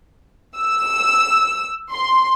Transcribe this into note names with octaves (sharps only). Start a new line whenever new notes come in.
E6
C6